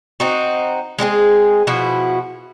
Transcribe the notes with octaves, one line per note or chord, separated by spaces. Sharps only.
C4 D#4 F#4
G#3 C4 D4 G#4
B2 F3 E4 F#4